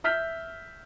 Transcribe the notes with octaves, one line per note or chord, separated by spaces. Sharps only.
E5 F6 G6 B6